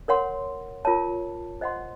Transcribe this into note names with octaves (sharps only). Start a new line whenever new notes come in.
A#4 C#5 F#5 C6
F4 A#4 C#5 A5
C5 D#5 F#5 C6